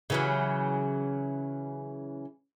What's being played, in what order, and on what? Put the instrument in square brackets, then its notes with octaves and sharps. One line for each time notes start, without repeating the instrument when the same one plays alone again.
[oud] C#3 E3 F#3